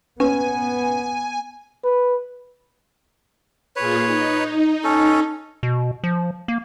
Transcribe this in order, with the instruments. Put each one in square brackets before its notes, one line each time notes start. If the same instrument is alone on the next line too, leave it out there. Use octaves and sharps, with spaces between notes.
[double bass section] B3 [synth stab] C#4 [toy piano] B4 [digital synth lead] G#5
[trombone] B4
[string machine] A#2 F4 G#4 [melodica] B4 C#5
[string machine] D#4
[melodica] C#4 A4
[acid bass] B2
F3
A#3